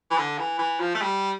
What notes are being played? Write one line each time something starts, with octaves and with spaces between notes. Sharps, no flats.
E3
D3
E3
E3
F3
A3
G3